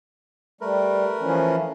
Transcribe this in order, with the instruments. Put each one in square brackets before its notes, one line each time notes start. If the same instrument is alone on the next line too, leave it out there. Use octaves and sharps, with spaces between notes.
[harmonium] G3 [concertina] A3 A#4 B4
[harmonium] E3 F3 C#4